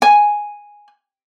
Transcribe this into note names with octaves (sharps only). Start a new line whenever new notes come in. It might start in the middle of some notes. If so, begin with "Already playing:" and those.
G#5